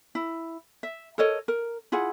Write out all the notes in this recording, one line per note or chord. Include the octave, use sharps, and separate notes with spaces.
E4
E5
A4 A#4 C#5 D#5
A#4
E4 F4 G#4 F#5